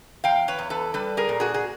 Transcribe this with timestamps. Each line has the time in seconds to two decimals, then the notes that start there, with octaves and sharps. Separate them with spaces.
0.24 E2 F5 G5
0.48 B4 C#5
0.59 E2
0.70 A4 B4
0.94 G3 A4 B4
1.17 G#4 A#4
1.29 A#2
1.40 F#4 G#4
1.54 G#4